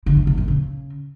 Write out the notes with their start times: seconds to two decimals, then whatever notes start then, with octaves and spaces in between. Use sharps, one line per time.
0.06 D3
0.17 F3
0.27 C3
0.37 A#2
0.48 C#3